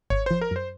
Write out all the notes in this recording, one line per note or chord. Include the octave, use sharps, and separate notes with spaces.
G#1 C#5
F3 C5
A#4
F#2 C5